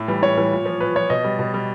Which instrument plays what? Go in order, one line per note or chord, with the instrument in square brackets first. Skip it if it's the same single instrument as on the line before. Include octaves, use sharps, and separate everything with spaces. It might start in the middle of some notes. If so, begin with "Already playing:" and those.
Already playing: [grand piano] A2
E3 G3
A2 C#5
E3 G3
A#2
F3
A#2 B4
F3 C#5
B2 D#5
G3
B2
G3